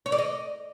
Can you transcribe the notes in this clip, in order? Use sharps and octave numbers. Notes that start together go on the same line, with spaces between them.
C#5
D5
D#5